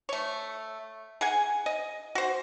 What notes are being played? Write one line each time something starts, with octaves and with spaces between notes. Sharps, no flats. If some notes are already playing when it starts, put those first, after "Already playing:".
A3 C#5
G#4 F#5 G#5
D#5
F#4 C5